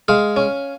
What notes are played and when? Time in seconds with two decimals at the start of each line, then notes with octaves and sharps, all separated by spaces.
0.08 G#3 F5
0.36 C#4